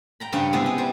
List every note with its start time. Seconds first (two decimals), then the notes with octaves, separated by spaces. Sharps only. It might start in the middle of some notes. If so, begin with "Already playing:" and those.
0.20 G5 A#5 B5
0.32 G2 C#3 G3 C#4 C#5 G5
0.53 C3 G#3 B3 D#4 E4
0.66 G#4
0.78 G3 C5